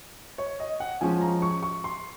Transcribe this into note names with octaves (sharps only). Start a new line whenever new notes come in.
C#5
D#5
F#5
F3 G#3 C#4 G#5
A#5
C#6
C#6
C6